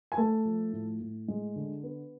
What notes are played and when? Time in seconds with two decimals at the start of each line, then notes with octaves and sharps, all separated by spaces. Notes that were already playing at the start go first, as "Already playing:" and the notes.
0.12 G#5
0.17 A3 A4 A5
0.45 F3
0.73 A2
1.01 A2
1.28 G#3
1.56 D3
1.83 B3